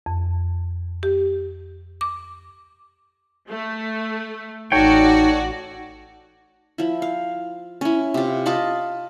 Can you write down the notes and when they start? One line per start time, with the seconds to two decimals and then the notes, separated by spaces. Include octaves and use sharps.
0.06 F2
1.03 G4
2.01 D6
3.50 A3
4.72 A1 D#4 F#4 A4 C#5 D5 G5
6.78 F3 E4
7.02 F5
7.81 C#4 E4
8.14 C3 F4
8.46 F4 D#5 A5 B5